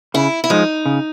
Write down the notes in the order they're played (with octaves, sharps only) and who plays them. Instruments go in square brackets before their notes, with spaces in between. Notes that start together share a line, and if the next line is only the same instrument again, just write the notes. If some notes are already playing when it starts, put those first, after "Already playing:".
[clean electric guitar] C#3 [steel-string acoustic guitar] E4
[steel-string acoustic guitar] E4
[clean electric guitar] F3 G#3 [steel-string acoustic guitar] D#4
[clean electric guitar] C#3